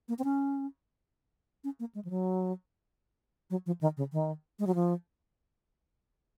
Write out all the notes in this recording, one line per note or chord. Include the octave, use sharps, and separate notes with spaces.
A#3
C4
C#4
C#4
A#3
G#3
F3
F#3
F#3
F3
D#3
C#3
D#3
G#3
F#3
F3